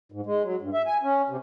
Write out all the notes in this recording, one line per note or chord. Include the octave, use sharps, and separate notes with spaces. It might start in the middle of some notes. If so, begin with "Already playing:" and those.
G#2
G#3
F#3
G2
E5
G#5
C#4
C3